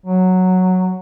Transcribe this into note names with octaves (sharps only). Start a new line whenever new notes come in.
F#3